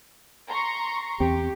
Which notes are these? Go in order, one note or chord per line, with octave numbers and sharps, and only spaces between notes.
A#5 C6 C#6
E2 C4 G4